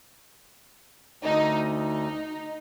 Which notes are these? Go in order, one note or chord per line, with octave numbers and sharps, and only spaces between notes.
D2 D#4
D#4